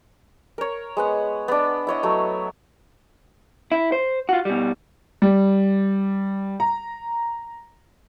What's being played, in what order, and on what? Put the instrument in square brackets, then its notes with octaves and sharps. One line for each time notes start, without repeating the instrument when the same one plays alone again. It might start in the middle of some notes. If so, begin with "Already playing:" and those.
[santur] A#4 C#5
G#3 B3 F#5
B3 D4
E4 C#5 D#5
F#3 A3
[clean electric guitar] E4
C5
F4 F#4
B2 G3
[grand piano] G3
A#5